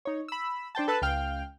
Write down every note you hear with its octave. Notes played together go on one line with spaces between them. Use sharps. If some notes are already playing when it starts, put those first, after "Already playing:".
D#4 C#5
B5 E6
D4 C5 G5 A5
A4 B4 A5 E6 F#6
C#2 F5 G5 F6